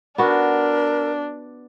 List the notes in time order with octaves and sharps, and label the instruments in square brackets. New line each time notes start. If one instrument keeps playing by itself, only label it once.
[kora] B3 F#4 [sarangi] D4 [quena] A#4